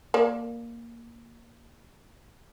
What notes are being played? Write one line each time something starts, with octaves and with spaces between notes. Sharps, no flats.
A#3 D5